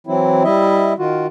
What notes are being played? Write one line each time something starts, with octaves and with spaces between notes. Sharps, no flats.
E3 F#3 C4 E4
G3 E4 D#5 E5
D#3 F4 F#4